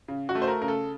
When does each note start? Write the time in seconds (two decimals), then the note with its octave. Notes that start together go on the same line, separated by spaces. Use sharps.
0.08 C#3
0.29 F#4
0.35 A3
0.42 C5
0.48 A#4
0.61 C#3 A#4
0.68 A4